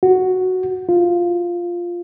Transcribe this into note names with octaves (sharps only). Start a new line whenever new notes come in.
F#4
F4